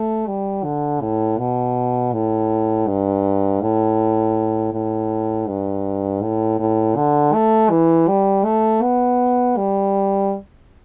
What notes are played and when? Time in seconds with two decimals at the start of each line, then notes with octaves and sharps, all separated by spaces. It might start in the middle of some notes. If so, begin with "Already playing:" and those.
Already playing: A3
0.27 G3
0.64 D3
1.01 A2
1.38 B2
2.13 A2
2.87 G2
3.62 A2
4.73 A2
5.48 G2
6.23 A2
6.59 A2
6.96 D3
7.34 A3
7.70 E3
8.08 G3
8.45 A3
8.82 B3
9.57 G3